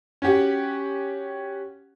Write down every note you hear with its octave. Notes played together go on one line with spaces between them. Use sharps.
C#4 F#4 G4 F#5